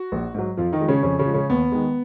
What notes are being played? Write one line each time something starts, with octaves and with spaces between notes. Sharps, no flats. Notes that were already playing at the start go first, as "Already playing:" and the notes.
Already playing: F#4
A#1
G#2 F#3
F2 F3 F4
D#3 D#4
F3 G#3
C#3 C#4
F2 C#3 C#4
C#3 C#4
F3 G#3
C#3 C#4
D#2 B3
D#3 G#3